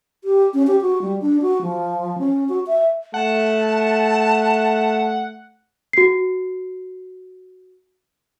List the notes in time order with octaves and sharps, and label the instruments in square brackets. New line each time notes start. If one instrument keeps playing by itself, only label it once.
[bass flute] G4
C#4
G4
F#4
G3
D4
F#4
F3
C#4
F#4
E5
[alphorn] A3 [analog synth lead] F#5 [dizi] A5
[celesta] F#4 C7